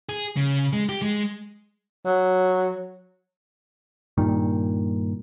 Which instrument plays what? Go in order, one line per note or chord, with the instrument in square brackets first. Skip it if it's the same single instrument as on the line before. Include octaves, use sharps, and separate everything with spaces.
[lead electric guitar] G#4
C#3
G#3
G4
G#3
[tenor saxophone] F#3
[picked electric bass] G2 A#2 D#3